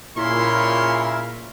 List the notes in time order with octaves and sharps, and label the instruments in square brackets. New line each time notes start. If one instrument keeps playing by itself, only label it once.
[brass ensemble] A#2 C#3 [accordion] E4 A#4 [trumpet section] C#5 C6